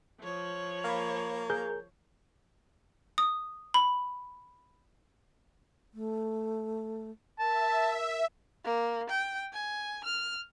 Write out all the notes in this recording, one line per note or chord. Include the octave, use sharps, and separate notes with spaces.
F3 C#5
A#3 F5 B5
G#4 A#4 G6
D#6
B5
A3
A#4 E5 A5
A#3
G5
G#5
F6